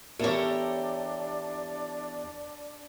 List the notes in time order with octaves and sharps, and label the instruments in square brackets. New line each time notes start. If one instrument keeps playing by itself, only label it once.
[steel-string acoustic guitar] E2 G4 [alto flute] D4 [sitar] A4 A#4 C#5